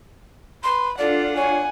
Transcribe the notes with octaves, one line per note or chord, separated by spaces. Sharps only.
B4 C6
D4 F4 A4 D5 F#5
C#5 G#5